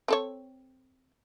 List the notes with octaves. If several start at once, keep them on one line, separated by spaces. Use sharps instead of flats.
C4 A4 C#5